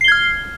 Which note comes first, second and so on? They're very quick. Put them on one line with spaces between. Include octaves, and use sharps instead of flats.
C7 G7 G#6 F6